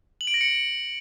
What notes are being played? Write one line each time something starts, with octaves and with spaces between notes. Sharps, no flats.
F#7
D7
A#6
C#7